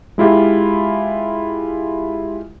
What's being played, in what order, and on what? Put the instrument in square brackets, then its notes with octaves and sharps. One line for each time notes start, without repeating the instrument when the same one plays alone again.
[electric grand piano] G#3 E4 F4 G4